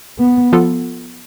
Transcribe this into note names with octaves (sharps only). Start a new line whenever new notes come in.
B3
F3 B3 F4 A4